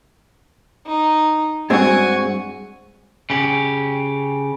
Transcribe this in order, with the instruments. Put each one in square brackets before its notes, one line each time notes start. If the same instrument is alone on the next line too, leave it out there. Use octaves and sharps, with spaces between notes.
[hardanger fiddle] D#4
[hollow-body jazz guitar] G2 G#3 C4 [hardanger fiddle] F#4 G#5
[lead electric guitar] C#3 G4